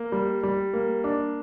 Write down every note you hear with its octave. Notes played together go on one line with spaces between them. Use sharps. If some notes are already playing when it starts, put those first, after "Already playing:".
Already playing: A#3
G3
G3
A#3
D4